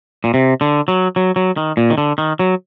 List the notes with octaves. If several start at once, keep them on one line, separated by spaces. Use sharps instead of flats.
A#2
C3
D3
F#3
F#3
F#3
D#3
A#2
D#3
D3
D#3
F#3